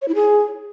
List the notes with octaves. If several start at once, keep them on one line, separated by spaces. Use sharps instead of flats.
C#5
E4
G#4